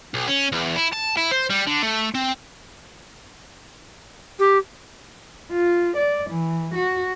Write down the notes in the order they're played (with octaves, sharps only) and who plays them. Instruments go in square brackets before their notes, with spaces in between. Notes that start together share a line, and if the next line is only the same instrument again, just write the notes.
[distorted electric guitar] B1
C#4
E2
E4
A5
E4
C5
G3
D3
A3
C4
[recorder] G4
[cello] F4
D5
E3
F#4